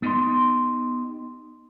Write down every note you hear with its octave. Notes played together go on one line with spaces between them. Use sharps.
B3 D#4 G4 D#5 C6